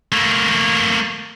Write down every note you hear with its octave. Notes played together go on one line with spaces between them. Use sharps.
A3 A#3